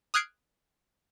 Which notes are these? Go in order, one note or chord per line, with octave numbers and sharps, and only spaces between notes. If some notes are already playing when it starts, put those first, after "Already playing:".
D#6 F6 F#6 G#6 C7 D7